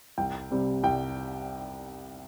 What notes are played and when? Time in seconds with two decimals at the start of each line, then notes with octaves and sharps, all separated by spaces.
0.18 C2 G5
0.51 C3 G3 C4
0.84 C2 G5